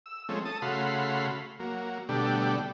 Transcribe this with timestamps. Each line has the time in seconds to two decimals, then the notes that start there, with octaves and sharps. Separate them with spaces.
0.06 E6
0.29 F3 G#3 A3 C4 C#4
0.45 A4 A5 D#6
0.62 C#3 A3 F#4 F5 B5 C6
1.59 F#3 A#3
2.09 B2 D3 G3 A3 D4 G4